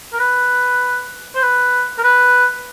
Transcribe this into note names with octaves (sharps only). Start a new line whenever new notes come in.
A#4
B4
C5
B4
A#4
B4